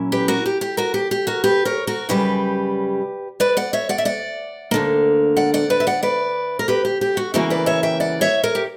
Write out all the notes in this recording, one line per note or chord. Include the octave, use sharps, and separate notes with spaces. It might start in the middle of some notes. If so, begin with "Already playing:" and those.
Already playing: A#2 F#3 C#4 E4
G4 B4
F#4 A#4
G4
G4
F#4 A#4
G4
G4
F#4 A#4
G4 B4
A#4 C#5
F#4 A#4
F#2 C#3 G3 G4 B4
B4 D5
D5 F#5
C#5 E5
D5 F#5
E5
D5 F#5
D2 D3 A#3
D5 F#5
D5 F#5
B4 D5
E5
D5 F#5
B4 D5
A#4
G4 B4
G4
G4
F#4
C#3 E3 A#3 F#4
B4 D5
C#5 E5
E5 G5
D5 F#5
C#5 E5
A#4 C#5
G4